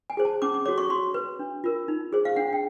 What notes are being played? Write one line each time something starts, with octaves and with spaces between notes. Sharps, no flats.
G#5
G#4 C5
A5
C#4 D6
D6
F#4 A4 C#5 D6
C#6
F#4 C6
B4
D4
F4 A#4
D#4
G#4 C5
F5
D4 F#5
G5